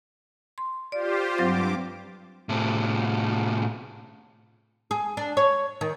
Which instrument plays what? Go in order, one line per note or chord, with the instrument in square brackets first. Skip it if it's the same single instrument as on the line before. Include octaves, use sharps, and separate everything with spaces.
[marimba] C6
[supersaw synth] F4 G4 C5 [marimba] D5
[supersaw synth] G2 D6 [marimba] F#3 C4 A6
[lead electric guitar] A2 C3
[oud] G#4
D4
C#5
D#3